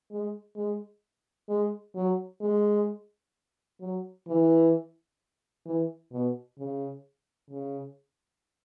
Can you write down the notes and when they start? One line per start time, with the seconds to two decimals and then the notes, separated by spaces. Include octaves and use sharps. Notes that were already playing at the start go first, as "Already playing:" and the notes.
0.11 G#3
0.56 G#3
1.49 G#3
1.96 F#3
2.42 G#3
3.81 F#3
4.27 E3
5.66 E3
6.11 B2
6.58 C#3
7.50 C#3